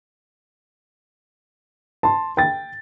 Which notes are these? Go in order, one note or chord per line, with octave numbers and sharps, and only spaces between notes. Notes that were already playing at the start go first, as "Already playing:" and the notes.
A5 C6
G5 A6